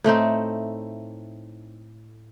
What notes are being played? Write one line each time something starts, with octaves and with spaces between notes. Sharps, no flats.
A2 A3 C4 D#4